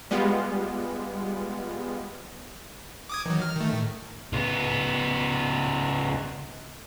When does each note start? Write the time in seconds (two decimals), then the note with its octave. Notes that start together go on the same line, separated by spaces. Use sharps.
0.11 G3 G#3 B3 F4
3.09 D6 D#6 G#6
3.26 D#3 E3 F#3
3.42 F6
3.56 D#3 A3
3.73 A2
4.33 C#2 B3